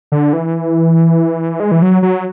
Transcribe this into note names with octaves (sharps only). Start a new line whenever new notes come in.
D3
E3
G#3
E3
F#3
F#3